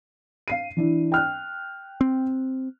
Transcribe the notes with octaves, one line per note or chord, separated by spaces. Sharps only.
F5 C7 D#7
E3 D4 E4
G5 F6 F#6
C4